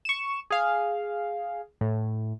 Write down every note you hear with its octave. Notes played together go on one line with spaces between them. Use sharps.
C#6 E7
G#4 F5
A2